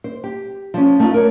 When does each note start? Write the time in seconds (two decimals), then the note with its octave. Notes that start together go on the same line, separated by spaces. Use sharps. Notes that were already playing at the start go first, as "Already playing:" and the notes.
0.04 C5
0.24 G4
0.74 F3 C#4
1.00 A3 D#4 F4
1.14 A#4 C#5